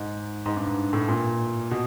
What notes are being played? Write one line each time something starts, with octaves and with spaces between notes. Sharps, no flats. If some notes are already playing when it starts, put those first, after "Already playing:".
Already playing: G#2
G#2
G2
G2
A2
A#2
B2